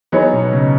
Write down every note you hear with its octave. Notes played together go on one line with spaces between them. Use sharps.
F#3 B3 D#4 G#4 C#5
B2
C#3